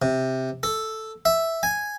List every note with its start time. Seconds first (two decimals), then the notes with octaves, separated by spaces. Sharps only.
0.02 C3
0.63 A4
1.25 E5
1.63 G#5